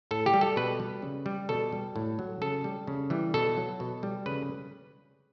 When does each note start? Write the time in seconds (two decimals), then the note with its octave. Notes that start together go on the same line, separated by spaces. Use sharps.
0.11 A2 A4
0.26 G4
0.34 G3
0.41 A4
0.56 B2 B4
0.80 G3
1.02 C#3
1.26 G3
1.49 B2 A4
1.72 G3
1.96 A2
2.19 F#3
2.42 C#3 A4
2.64 G3
2.87 C#3
3.10 E3 G3
3.34 B2 A4
3.57 F#3
3.80 B2
4.03 G3
4.26 C#3 B4